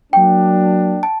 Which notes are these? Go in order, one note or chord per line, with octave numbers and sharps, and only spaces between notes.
F#3 A#3 D4 G5
A5